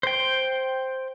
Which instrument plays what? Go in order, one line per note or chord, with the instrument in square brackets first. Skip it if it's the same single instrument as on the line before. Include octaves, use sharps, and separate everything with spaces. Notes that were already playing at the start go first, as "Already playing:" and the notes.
[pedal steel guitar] C5 G5